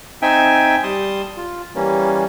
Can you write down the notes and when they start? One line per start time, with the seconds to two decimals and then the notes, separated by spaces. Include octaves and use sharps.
0.22 C4 D#4 E5 G5 G#5
0.83 G3 A5 C6 D#6
1.37 F4
1.75 E3 G3 A#3 C#4